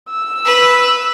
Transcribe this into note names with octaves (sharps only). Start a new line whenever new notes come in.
E6
B4